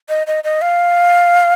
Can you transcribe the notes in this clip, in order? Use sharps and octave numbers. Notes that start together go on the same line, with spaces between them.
D#5
D#5
D#5
F5